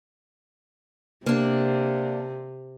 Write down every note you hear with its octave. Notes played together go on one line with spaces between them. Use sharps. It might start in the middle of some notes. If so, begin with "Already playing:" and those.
C3 A#3 D4